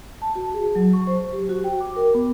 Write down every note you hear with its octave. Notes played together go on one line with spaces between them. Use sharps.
A5
F#4
G#4
F#3
C#6
C5
G4
F#4
G5
D6
A#4
B3